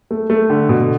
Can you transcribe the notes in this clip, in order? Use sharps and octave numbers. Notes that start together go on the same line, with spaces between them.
A3
A3
D3
B2